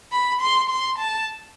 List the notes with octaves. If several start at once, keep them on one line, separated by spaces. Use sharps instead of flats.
B5
C6
C6
A5